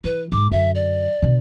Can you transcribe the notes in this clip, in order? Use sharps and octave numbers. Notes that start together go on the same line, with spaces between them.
E3 B4
G#2 G#3 D6
F#2 D3 E5
D5
B2 D3